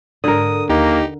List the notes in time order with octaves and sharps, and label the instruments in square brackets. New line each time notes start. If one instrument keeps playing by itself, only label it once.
[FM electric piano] G#2 A4 [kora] D3 A#4 [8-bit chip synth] D#6
[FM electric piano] D#2 [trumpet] A#3 [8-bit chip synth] D#4 G4